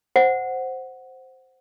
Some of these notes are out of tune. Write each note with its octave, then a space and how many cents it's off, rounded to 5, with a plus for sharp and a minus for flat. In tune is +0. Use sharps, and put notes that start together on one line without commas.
C5 +0 F#5 +0